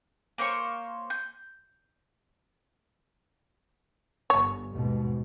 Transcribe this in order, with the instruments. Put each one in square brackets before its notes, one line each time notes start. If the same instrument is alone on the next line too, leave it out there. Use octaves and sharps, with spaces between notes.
[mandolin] A#3 C5 C#5 C#6
G6
[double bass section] G1 [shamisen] C#5
[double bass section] D#2 G#2 B2